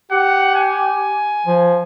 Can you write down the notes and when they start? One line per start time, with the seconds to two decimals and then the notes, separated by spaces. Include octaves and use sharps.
0.12 G4 F#5
0.56 G#5
1.46 F3